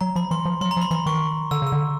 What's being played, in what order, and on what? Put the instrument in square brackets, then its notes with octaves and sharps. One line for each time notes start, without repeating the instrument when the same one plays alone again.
[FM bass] F#3 [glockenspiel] A#5
[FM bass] F3 [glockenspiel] B5
[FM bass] E3 [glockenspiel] C6
[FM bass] F3
[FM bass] F#3 [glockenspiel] C6
[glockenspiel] A#5
[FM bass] F3 [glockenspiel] B5
[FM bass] E3 [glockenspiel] B5
[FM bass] D#3 [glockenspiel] C#6
[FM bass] D3 [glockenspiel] E6
[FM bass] C#3 [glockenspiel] E6
[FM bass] D3